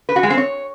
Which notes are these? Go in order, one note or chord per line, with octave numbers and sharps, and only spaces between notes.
B4
F#4
G#3
C4
C#5